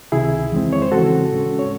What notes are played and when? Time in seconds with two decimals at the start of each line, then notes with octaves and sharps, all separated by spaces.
0.12 C#2 C3 D#3 E4 G#4
0.52 E2 D#3 G#3 C4
0.73 C#5
0.82 C5
0.91 D#2 C#3 E3 C4 F#4 A4
1.31 A2 G#3 C#4
1.59 C#5